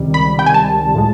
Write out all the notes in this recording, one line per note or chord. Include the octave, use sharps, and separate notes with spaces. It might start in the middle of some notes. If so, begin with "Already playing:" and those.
Already playing: C#2 C3 D#3 G3
B5
G5
G#5
A5
A2 F3 G#3